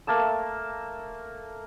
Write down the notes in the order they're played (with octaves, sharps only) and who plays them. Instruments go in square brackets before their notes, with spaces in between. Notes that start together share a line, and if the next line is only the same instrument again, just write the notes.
[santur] A3 A#3 A5 E6